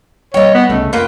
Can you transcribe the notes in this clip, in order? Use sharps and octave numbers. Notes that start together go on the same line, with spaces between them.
G3 A#3 C#5 D#5 G5
B3
C2 C#3 A3
F1 A#3 B3 F4 G5